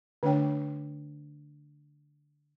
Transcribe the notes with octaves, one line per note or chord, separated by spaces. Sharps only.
D3 A3 D4 C#5 G5